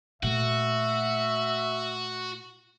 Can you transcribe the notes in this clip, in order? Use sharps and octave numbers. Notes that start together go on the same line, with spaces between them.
A#2 A3 F#4 E5